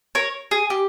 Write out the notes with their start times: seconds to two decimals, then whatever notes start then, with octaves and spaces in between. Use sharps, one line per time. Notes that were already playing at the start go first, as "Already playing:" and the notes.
0.15 A#4 C#5
0.51 G#4
0.70 G4